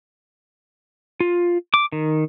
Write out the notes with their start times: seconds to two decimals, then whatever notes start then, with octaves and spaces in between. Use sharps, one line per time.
1.20 F4
1.74 D6
1.92 D#3